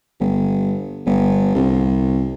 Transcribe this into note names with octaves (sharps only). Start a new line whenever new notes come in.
G1
G1
C2